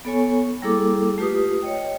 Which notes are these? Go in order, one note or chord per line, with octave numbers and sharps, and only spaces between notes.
B3 A4 C#5 G#5 C#6
G3 A#3 E4 G#4 A4 D6
A3 F4 G4 B4 D#6
C#5 D#5 G5